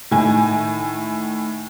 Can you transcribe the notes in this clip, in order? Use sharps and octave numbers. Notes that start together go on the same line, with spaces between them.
A2 D#3 G#5